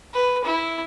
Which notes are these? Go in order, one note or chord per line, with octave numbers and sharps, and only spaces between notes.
B4
E4